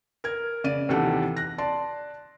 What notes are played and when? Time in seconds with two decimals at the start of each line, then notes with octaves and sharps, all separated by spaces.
0.24 A#4 G#6
0.64 C#3 D5 D#7
0.89 D#2 C3 E3 G4 A4 F#5
1.37 F#6 A#6
1.58 D5 A5 C6